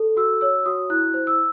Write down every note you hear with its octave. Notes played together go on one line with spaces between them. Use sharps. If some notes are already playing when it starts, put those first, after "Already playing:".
Already playing: A4
F#4 E6
C#5 E6
F#4 D#6
E4 F#6
C5
E6